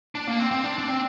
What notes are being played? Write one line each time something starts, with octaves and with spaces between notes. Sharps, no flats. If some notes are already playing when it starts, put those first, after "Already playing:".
D4
A#3
C4
C4
D4
D4
C4